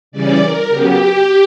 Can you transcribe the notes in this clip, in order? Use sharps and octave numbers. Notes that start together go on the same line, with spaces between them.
C#3 E3 G3 C#4 D5
A#4
C#3 F#3 B3 G4